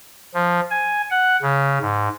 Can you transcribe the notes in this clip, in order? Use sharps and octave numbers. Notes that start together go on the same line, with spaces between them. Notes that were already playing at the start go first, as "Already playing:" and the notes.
F3
G#5
F#5
C#3
G#2